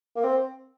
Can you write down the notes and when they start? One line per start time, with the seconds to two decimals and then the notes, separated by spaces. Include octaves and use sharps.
0.16 A#3
0.23 C4